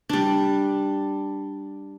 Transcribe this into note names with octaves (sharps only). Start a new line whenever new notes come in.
G3 D4